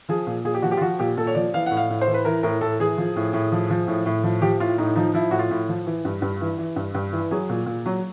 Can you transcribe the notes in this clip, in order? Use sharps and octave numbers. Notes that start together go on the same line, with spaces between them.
F3 G#4
A#2
A#2 G#4
G4
F3 F#4
G4
F4
F3 F#4
A#2 G4
A#2 A4
C#5
F3 D5
E3 F5
A2 F#5
F5
A2
C5
E3
B4
E3 A#4
A2 A#4
A2 A4
E3 G#4
F3
A2
A2
F3
F3
A2
A2
F3
F3 G4
A2 F4
A2 D#4
F3 D#4
F3 E4
A2 F#4
F4
A2
F3
E3
G2
G2
E3
E3
G2
G2
E3
F#3 G#4
A#2
A#2
F#3